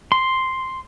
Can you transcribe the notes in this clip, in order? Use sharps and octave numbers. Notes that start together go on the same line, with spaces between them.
C6